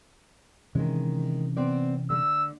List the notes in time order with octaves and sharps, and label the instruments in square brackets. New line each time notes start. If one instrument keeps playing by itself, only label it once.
[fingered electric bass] C3 E3 C#4 [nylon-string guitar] D#3 G#3
[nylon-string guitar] B3 C4 D5
[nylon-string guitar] D3 A3 [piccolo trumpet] E6